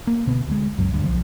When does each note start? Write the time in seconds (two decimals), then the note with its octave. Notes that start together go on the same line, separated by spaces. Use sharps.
0.07 A#3
0.26 D2 B2 B3
0.47 D2 G#3
0.78 F#1 C#2 F#2 F#3
0.93 D2 G2
1.05 B1 F3